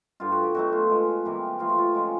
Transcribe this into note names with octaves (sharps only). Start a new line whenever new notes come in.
G2 D3 G3 F4
F#4
G4
B2 F#3 A3 F#4
F4
B2 G#3
C3 E3 G3 A#3
C3 F3 A3 F4
F#4
F4
C#3 F3 G#3